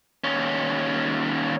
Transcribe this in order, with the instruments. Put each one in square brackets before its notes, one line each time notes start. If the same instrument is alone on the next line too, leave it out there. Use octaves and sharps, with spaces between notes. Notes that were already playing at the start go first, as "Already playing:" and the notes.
[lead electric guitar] D#2 C#4